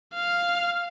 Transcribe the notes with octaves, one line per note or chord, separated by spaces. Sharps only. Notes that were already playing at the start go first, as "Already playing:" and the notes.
F5